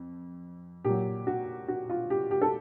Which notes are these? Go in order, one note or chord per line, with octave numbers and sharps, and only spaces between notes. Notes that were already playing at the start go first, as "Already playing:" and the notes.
Already playing: F2
A#2 F#3 G4
F#4
F#4
F4
G4
G4
A4